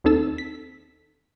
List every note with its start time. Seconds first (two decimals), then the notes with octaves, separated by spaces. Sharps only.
0.04 D#2 C4 D#4 A4 A5 E6
0.38 B6